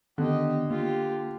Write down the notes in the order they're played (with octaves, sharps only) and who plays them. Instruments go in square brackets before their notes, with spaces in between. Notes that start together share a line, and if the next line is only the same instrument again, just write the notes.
[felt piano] D3 [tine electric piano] D#3 B3 [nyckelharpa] G4 D#5
[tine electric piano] A#3 [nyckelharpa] F4 G4